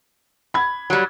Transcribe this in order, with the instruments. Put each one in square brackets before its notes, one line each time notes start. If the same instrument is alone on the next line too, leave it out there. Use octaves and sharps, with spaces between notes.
[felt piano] B5 G#6
[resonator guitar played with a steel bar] F#3 G3